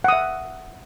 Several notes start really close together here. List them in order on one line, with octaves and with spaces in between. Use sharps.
F#5 D#6 E5